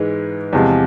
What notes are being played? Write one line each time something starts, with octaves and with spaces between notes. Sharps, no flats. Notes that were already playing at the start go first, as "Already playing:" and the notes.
Already playing: G#2 E3 G#3
E2 C3 F3 G#3